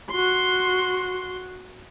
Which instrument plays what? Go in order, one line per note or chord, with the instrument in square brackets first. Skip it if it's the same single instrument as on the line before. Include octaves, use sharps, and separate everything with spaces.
[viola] F#4 C6